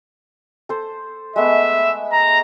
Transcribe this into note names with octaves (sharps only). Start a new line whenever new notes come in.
A4 C5
G#3 A3 B3 E5
A#5